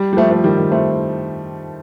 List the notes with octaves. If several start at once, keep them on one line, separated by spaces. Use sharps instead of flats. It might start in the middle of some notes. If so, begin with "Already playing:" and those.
Already playing: G3
G3
F3 A3
F3 A3
D#3 G3
D#3
A3 C4